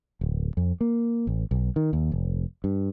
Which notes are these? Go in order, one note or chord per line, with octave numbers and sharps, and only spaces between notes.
D1
F2
A#3
A1
B1
D#3
D#2
F1
G2